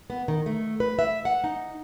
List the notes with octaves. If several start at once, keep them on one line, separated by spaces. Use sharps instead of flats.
B3
D#3
A3
B4
E5
F#5
D#4